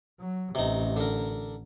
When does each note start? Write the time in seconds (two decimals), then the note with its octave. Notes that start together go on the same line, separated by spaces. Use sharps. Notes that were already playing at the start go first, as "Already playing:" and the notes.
0.19 F#3
0.55 A1 C3 D#4
0.96 D3 A#4